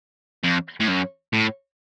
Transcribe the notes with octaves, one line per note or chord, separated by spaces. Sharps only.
F2
A2
F#2
A2